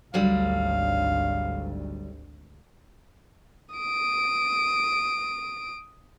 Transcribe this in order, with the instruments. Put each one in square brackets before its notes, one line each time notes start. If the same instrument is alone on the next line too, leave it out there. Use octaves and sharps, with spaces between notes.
[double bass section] G#1 D2 G#2 [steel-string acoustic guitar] D3 F#3 G3 [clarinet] F5
[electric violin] D#6 D7